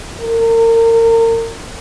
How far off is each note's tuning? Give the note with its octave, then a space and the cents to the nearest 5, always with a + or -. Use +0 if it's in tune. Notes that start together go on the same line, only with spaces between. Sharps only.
A#4 -35